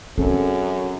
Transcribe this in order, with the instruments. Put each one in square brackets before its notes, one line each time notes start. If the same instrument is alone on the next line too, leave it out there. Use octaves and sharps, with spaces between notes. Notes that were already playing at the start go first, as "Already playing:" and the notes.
[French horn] F#2 [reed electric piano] C4 G#4 A4 [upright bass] C#4